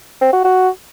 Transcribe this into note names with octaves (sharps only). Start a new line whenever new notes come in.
C4
F#4
F#4